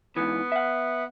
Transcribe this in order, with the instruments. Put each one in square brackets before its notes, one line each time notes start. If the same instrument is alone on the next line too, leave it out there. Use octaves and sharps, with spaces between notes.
[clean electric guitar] G#2 E3 [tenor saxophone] B3
[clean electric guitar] E5 F#5